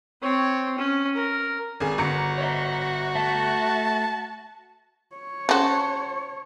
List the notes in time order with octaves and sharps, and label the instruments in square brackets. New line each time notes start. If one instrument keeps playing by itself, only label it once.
[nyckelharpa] C4 C#5
C#4
A#4
[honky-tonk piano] G#1 G#4
[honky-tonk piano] G1 A#5 C#7 [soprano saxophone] F#4
[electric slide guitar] C#5 D#5 E5
[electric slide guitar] A3 E5 [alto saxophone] A5
[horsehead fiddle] C#5
[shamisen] C#3 F#4 [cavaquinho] C5 A5